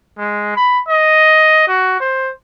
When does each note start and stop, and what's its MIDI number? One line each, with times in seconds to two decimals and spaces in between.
0.18 0.56 56
0.56 0.79 83
0.89 1.67 75
1.68 2.00 66
2.00 2.31 72